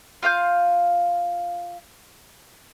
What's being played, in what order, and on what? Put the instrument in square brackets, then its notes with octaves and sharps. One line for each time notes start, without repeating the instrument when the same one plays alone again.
[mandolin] F4 F5 D#6 G6